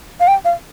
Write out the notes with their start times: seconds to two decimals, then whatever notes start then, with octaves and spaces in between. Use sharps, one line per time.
0.20 F5
0.28 G5
0.45 F5